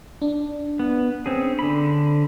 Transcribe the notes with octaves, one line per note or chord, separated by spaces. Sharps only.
D4
B3
C4 C#4 G#4
D3 B5